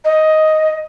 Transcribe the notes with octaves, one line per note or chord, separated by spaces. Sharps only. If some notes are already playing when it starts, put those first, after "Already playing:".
D#5